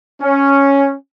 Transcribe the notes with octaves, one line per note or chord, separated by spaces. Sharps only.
C#4